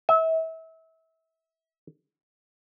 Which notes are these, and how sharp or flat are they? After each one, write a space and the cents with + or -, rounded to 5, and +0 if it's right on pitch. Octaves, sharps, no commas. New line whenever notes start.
E5 -30